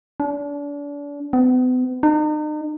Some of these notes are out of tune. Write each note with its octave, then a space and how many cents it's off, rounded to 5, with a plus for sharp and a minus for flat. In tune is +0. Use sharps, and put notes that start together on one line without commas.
D4 -35
B3 +40
D#4 -40